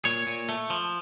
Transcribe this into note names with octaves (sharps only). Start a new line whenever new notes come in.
A#2 C#5
A#2
A3
F3